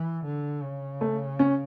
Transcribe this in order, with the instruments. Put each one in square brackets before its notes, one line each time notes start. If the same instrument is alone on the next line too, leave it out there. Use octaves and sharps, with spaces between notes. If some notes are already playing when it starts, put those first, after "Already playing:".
Already playing: [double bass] E3
D3
C#3
[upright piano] A3
C#4